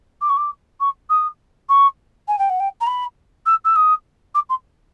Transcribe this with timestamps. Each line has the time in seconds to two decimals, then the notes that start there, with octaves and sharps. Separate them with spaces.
0.21 D6
0.29 C#6
0.37 D6
0.80 C#6
1.09 D#6
1.69 C#6
2.28 G#5
2.38 G5
2.49 F#5
2.60 G5
2.80 A#5
2.86 B5
3.46 E6
3.64 E6
3.75 D#6
4.34 D6
4.49 C6